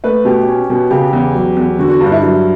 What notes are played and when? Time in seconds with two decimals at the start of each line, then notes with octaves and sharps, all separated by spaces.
0.04 A3 B4
0.25 B2 G4
0.48 C#4
0.70 B2
0.91 C#3 G4
1.13 E2
1.35 F#3
1.57 E2
1.79 D3 F#4
1.90 F#4
2.00 G2 D4
2.12 E4
2.22 F#3 E4